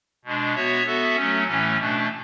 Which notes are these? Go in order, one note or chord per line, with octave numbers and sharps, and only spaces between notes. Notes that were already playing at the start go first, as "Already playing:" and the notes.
B2 G#3 D4
B3 F#4 C#5 E5
B3 F#4 A4 E5
F#3 A3 C#4
A2 E3 A3 C#4
B2 A3 D4